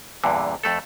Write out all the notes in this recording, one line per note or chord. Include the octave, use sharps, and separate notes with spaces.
E2 G2 A#2 D3
F2 A3 A4